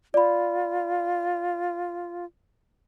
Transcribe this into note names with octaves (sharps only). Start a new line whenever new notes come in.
F4 D5 B5